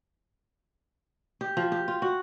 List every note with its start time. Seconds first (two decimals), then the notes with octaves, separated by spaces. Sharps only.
1.41 G4
1.57 F3
1.72 G4
1.88 F4
2.02 F#4